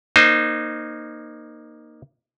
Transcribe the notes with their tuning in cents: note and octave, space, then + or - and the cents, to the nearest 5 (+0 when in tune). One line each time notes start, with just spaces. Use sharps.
A#3 +10 D#4 -20 C5 +0